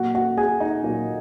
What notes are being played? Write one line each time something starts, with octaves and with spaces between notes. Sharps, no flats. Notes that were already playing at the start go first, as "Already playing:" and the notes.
Already playing: A#2 F#3 A#3 F#4 F#5
F#4 F#5
G#4 G#5
D#4 D#5
A#2 F#3 A#3